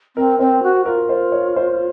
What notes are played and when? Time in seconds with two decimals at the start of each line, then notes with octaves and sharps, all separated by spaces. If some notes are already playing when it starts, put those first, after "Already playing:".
0.16 C4 A#4
0.39 C4 C5
0.63 F#4
0.86 F4 A#4
1.09 C5
1.32 C#5
1.56 C5